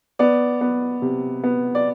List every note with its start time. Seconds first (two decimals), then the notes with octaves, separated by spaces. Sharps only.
0.19 B3 D5
0.61 B3
1.02 C3
1.44 B3
1.75 D5